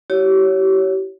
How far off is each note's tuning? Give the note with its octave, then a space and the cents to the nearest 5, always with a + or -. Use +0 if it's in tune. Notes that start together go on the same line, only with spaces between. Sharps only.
E4 +0 G4 -40 C#5 +10